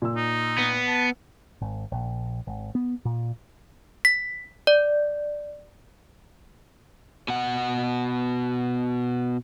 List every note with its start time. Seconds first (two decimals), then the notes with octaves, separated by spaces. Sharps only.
0.02 A#2 E6
0.16 D#4
0.58 B3
0.87 A5
1.61 G#1
1.92 A#1
2.47 G#1
2.75 B3
3.05 A#2
4.05 B6
4.67 D5
7.28 B2 F#5